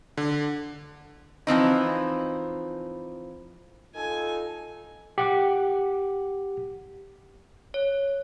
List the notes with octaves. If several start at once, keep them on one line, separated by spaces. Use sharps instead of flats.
D3
E3 F3 C4 D#4
D#4 F4 A4 G#5
G4 F#5 D6
C#5